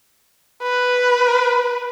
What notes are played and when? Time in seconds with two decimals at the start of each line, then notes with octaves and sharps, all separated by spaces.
0.63 B4